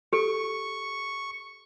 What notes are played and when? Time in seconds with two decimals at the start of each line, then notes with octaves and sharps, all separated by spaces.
0.13 G4 A4 C#6